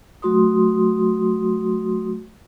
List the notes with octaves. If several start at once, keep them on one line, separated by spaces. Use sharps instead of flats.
F#3 A3 F#4 C6 D#6